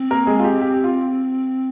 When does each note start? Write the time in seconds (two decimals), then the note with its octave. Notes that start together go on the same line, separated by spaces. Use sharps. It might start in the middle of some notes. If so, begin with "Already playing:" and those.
Already playing: C4
0.11 A#3 A#4
0.27 G#3 G#4
0.39 F4
0.44 G4
0.61 G4
0.74 G4
0.84 F4